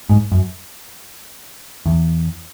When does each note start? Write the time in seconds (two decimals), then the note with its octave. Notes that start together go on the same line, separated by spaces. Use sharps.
0.09 G#2
0.32 F#2
1.86 E2